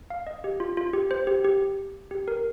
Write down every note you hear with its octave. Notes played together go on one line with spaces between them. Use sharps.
F5
D#5
G4
F4
F4
G4
C5
G4
G4
G4
A#4